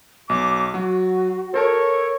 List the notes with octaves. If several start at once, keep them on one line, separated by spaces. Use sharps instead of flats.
B1 D6
F#3 F#4
A4 A#4 C#5 A5